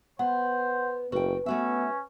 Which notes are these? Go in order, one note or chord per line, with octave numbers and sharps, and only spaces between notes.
B3 C5 F#5
F#1 F#4 B4 G5
A3 B3 C#4 F#4 E5